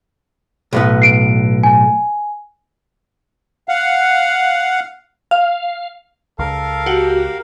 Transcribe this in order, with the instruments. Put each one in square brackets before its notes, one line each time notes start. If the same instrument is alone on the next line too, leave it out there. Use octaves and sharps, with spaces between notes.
[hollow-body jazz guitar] B1 A2 B3
[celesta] C7 D7
G#5
[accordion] F5 F#5
[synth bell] F5
[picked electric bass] C#2 [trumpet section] A4 [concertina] A#4 F5
[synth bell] F#4 G4